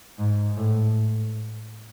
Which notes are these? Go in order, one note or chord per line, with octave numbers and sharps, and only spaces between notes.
G#2
A2